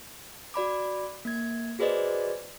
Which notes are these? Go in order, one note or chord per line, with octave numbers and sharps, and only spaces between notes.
F#4 D5 B5 D6
A#3 G#6
F#4 G#4 B4 C5 D5 D#5